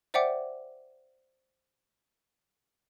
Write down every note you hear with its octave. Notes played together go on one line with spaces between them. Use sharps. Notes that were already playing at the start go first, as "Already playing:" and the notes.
C5 D5 E5 F#5 G5 D6